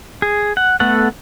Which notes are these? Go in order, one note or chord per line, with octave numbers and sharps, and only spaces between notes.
G#4
F#5
A3 B3 A4 F#5